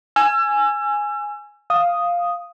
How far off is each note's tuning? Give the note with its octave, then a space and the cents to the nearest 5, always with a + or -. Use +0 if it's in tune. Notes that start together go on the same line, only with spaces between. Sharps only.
G#5 +0 E6 +35
F5 +0 D#6 +0